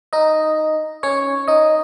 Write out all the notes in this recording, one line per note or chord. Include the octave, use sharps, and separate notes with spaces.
D#4 D#5
C#4 C#5
D#4 D#5